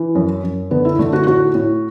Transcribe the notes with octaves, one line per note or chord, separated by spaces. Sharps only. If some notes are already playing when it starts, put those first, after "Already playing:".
Already playing: E3
F#2
F#2
D3 B3
E4
D3 A3
F#4
A2 F#4
A2